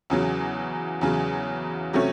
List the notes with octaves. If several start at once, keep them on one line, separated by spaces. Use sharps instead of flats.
E2 C#3 F#3
E2 C#3 F#3
C3 F#3 A3 C#4